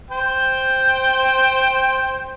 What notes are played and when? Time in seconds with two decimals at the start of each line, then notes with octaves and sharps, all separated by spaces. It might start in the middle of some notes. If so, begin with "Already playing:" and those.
0.10 C5 G5